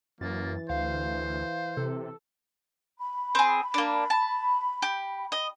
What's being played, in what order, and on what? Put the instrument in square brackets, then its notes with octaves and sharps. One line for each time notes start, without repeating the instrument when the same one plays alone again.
[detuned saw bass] F#2 [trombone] E3 [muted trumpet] A#3 [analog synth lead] A6
[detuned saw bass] D2 [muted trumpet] C5 [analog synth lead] F5
[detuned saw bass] C3 [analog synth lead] A4
[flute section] B5
[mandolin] C4 G#4
A#3 D4
A5
G4
D#5